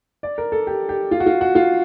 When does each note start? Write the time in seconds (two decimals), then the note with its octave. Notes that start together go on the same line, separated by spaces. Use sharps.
0.23 D5
0.38 A#4
0.52 A4
0.67 G4
0.89 G4
1.11 F4
1.20 F#4
1.26 F4
1.41 F#4
1.55 F4